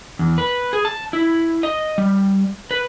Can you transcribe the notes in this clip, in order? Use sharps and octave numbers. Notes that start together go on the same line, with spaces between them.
E2
B4
G#4
A5
E4
D#5
G3
B4